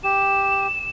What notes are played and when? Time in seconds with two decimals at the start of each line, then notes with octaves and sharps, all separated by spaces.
0.04 G4 E7